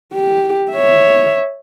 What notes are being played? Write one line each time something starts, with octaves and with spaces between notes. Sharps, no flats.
G4
C#5 E5